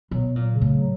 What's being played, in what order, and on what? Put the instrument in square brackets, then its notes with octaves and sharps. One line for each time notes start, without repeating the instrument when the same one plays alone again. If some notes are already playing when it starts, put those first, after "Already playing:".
[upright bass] B2 [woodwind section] F#3
[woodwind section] F#3
[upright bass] A#2
[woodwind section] C#3
[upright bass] A2
[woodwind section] F#3